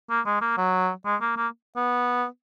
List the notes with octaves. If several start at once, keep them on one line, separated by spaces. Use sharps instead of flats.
A#3
G#3
A#3
F#3
G#3
A#3
A#3
B3